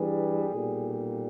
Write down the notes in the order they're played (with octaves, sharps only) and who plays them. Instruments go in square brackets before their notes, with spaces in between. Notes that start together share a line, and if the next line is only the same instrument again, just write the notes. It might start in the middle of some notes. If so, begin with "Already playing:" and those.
Already playing: [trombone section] G2 E3 G3 G#4
B1 A#2 G3